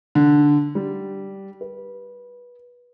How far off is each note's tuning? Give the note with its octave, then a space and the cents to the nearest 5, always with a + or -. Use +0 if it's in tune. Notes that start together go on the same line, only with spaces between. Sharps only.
D3 -5
G3 -10
B4 -20